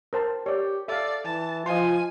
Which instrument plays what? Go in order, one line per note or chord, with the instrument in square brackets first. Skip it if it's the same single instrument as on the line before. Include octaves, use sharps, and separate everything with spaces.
[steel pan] A#4 C5 A5
[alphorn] G4 [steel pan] C#5 D5
[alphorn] A4 [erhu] D5 [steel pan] E5 F5
[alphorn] E3 [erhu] A5
[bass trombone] F3 [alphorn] F4 [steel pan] D#5 C6 [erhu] G#5